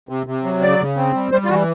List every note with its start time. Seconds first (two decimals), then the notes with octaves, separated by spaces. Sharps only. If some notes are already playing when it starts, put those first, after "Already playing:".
0.09 C3
0.27 C3
0.44 F#3
0.62 C#3 D5
0.79 C#3
0.97 C4
1.14 G3
1.32 G3 C5
1.45 F4
1.50 E3 F#4